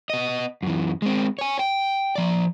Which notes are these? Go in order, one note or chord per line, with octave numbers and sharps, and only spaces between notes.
B3 D#5
F#2 E3
G#3 C4
C#5 G#5
G5
F3 D5